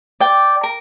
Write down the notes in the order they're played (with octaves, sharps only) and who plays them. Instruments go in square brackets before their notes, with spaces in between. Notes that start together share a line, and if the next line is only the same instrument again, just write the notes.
[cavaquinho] D5 G5
A#4